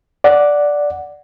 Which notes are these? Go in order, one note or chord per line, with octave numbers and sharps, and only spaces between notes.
D5 F#5